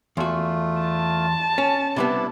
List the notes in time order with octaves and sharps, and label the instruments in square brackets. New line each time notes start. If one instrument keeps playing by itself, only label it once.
[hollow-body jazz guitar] E2 F#4 [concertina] A3 F4
[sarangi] A5
[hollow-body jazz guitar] C#4
[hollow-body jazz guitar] C3 G3 B3 [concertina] D4 E4